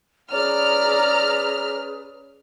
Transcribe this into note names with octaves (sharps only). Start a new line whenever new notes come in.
C#4 G#4 B4 D5 A#5 F6